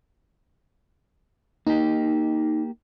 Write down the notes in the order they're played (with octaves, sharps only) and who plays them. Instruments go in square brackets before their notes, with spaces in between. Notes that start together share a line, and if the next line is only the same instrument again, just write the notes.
[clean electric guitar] A#3 G4 [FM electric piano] D#4